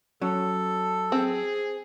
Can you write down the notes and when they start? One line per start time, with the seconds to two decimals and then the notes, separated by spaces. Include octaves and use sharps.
0.22 F#3 C#4 A4
1.12 C4 G#4